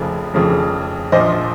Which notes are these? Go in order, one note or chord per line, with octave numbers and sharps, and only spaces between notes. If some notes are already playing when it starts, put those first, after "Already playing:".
Already playing: F1 F2 C#3 F3
F1 F2 C#3 F3
A#1 A#2 F3 C5 D#5